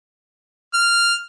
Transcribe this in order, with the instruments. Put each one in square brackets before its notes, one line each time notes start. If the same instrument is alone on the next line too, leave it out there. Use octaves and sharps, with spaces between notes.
[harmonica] F6